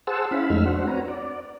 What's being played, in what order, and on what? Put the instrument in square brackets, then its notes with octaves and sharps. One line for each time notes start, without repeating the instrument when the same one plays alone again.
[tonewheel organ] G#4 C5 F#5 A5 E6
C#4 E4 F5 B5
F2 G#3 A3 D#4 E6 F6
D4 F#4 C5 F#5
C4 F#4 B4 C#5 A#5
D5